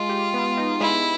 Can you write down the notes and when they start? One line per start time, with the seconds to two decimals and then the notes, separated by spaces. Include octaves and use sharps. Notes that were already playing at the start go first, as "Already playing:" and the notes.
Already playing: G#3 F4
0.09 G4
0.34 B3
0.57 D#4
0.81 G#3 E4